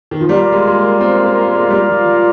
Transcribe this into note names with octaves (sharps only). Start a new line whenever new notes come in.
D#3
F3
G3 F4 A#4 D5 F5
G#3
G#3
A#3
C4
A#3
G#3
G#3
G3
F3
F3